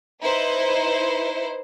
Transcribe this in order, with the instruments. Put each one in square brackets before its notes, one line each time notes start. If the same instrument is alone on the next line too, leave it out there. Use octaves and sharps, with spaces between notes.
[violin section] D#4 E4 B4 C5